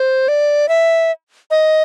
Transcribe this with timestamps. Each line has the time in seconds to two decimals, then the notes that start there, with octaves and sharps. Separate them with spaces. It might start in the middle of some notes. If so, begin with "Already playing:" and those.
Already playing: C5
0.28 D5
0.69 E5
1.51 D#5